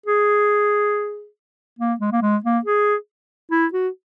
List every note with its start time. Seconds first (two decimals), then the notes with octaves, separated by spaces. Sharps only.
0.06 G#4
1.79 A#3
2.01 G#3
2.12 A#3
2.22 G#3
2.44 A#3
2.65 G#4
3.51 E4
3.73 F#4